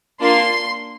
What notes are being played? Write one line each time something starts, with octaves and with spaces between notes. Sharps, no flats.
A#3 D4 F4 C6